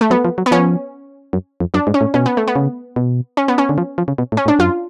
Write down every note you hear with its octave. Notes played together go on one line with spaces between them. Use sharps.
A3
F#3 B3
F3
F#3
B3
F3 C#4
F#2
F2
F#2 D4
G#2
C#4
A2
B2 C#4
B3
A3
B3
C#3
B2
C#4
B3
C#4
D3
F3
F3
C#3
B2
A2
C#4
A2 D4
F#2 F4